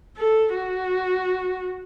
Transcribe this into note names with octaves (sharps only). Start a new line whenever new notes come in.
A4
F#4